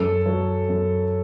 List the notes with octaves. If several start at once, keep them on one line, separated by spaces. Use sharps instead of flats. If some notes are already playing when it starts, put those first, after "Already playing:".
Already playing: F#2 A4
F#3
F#2